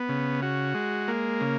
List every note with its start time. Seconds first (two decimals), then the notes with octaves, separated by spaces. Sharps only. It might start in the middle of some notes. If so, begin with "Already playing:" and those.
Already playing: B3
0.09 C#3
0.42 F#4
0.74 G#3
1.08 A#3
1.41 C#3